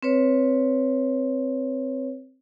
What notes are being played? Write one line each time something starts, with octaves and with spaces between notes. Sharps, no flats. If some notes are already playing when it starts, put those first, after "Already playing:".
C4 B4 C#5